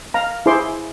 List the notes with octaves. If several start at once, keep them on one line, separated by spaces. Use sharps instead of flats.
F5 A#5
E4 G#4 C5 C6 D6